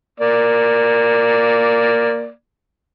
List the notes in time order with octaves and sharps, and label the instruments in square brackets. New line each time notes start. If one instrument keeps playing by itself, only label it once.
[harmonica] A#3 D5